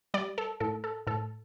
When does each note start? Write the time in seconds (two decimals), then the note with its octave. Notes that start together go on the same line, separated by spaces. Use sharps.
0.14 G3 D5
0.38 A4
0.60 A2 A4
0.84 A4
1.07 A2 A4